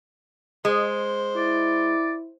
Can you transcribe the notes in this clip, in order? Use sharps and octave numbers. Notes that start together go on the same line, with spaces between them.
G#3 C5
E4 D5